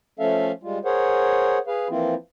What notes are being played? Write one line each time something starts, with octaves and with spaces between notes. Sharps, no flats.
F3 A3 C#4 A4 E5 F5
G3 G#3 F4
G#4 A#4 C5 C#5 F#5
G#4 B4 F5
E3 F3 A#3 C4 E4 F4